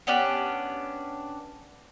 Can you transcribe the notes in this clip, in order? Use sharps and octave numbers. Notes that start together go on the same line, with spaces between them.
B3 C#4 D4 G4